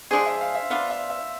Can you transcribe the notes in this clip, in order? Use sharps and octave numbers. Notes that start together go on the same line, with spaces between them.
F3 G#3 D4 G#4 C5
E5
F5
E5
B3 D4 F4 F5
E5
E5